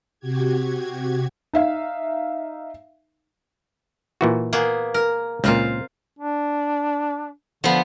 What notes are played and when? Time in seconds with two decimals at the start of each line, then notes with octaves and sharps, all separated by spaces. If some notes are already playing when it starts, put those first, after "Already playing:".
0.20 C3 F#4 G4 G#6
1.53 D#4 E5 F5
4.21 A#2 E3 F#4
4.53 A#3 B3 G#4
4.94 A#4
5.44 C#2 A#2 C4 F4 F5
6.19 D4
7.64 D3 F3 B3